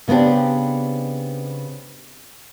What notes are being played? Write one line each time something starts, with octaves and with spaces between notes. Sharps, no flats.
C#3 B3 C4 D4 G4